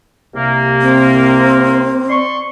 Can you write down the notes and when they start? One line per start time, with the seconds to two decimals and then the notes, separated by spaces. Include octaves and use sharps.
0.34 C2 C3 A#3
0.82 C4
2.10 D5 C6 C#6